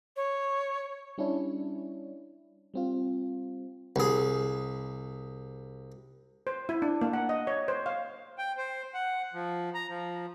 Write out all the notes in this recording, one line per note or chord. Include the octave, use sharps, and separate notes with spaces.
C#5
G3 C#4 D4 E4
G3 C4 F4
C2 G#4
C5
E4
D4
A#3
F#5
D#5
C#5
C5
F5
G5
C5
F#5
F3
A#5
F3